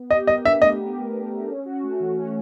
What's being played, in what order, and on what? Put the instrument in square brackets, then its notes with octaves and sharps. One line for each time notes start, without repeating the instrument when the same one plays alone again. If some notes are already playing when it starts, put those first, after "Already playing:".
Already playing: [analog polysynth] B3
[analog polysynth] G4 [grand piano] D#5
[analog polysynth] A#4 [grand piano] D#5
[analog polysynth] D4 [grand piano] E5
[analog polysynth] A3 [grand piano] D#5
[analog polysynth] G4
A#4
D4
A3
C#4
F#4
A3
E3
C#4